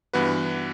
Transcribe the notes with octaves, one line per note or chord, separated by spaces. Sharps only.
G2 E3 B3 F#4 B4